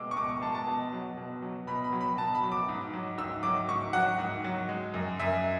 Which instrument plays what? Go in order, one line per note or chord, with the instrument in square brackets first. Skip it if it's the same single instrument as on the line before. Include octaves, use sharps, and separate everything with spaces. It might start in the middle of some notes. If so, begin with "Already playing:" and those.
Already playing: [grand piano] B2 G#3 D6 E6
C#6
B2 D6
C#6
G#3 A5
A5
B2
F#3
B2
F#3
B2 B5
B5
F#3
B5
B2 A5
B5
F#3
D6
G#2
F#3
G#2 E6
F#3 D6
G#2 C#6
F#3 F#5
G#2
F#3
G#3
F#2
F#2 E5